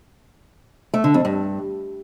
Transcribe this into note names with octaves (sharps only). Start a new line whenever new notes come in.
A3
D3
F2
G2